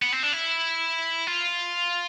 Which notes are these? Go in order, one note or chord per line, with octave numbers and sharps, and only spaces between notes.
B3
C4
D4
E4
F4